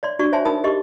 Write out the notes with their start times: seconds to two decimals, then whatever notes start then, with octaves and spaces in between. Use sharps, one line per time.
0.03 C#5 D5 C6
0.19 D4 F#4 D5 C#6
0.32 C5 C#5 E5 G#5 A5 C6
0.45 D#4 A#4 G5 A5 B5 D#6
0.64 G4 G#4 D#5 C6 C#6